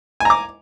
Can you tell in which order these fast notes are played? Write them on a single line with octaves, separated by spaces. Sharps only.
G#5 A#5 D6